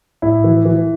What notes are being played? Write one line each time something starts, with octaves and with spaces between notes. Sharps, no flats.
A2 E4
E3
E3